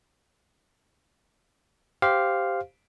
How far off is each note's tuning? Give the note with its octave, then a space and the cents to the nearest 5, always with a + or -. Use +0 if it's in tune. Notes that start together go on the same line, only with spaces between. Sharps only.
G4 +0 C5 -5 F5 +0